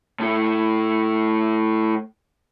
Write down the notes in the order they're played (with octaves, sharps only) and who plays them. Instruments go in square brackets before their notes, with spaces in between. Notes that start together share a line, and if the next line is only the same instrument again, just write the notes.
[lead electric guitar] A2 A3